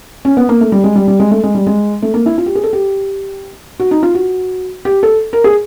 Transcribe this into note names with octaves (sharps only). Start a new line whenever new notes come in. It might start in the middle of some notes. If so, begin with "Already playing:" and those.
C#4
B3
A#3
A3
G3
G#3
G3
G3
G#3
A3
G#3
G3
G#3
A3
A#3
E4
F4
G4
G#4
A4
G4
F#4
D#4
F4
F#4
G4
A4
A#4
G#4